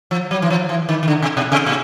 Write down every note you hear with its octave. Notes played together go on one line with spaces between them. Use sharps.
F3
F#3
E3
F3
E3
D#3
D#3
D3
C3
B2
C3
A#2